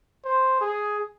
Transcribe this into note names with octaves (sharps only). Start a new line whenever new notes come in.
C5
G#4